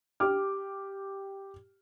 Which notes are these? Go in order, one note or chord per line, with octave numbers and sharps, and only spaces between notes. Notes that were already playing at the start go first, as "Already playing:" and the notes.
G4 G5 D6 F6